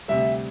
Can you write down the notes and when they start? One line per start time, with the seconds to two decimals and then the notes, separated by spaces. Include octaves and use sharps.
0.08 D2 C3 G3 E5